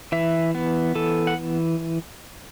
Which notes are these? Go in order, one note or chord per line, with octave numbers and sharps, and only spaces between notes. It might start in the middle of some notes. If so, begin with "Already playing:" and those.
E3 E5
B3
E3 A4
F#5